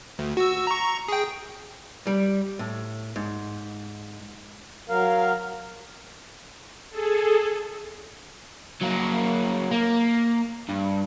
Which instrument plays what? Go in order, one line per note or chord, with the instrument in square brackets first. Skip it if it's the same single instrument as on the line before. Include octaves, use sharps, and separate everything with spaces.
[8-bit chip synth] D2
F#4 E6
A#5 C#6
G#4 G5
[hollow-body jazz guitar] G3
A2
G#2
[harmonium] F#3 A#4 F5
[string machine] G#4 A4
[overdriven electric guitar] F#3 A#3
A#3
G2